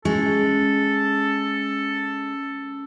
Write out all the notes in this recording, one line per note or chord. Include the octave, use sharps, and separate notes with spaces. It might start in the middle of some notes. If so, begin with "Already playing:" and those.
G#3 C#4 A4